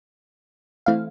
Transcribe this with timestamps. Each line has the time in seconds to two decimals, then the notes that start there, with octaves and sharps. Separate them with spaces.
0.86 E3 A3 C4 E4 F5